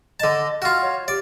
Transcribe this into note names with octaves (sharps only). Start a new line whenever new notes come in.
D3 D#5 A5
F4 F#4 F6
C#5
G4 D5